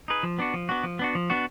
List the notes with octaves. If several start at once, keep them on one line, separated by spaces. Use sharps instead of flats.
D#4 G#4 B4
F3
B3 D4 F#4
F3
B3 D4 F#4
F3
B3 D4 F#4
F3
B3 D4 F#4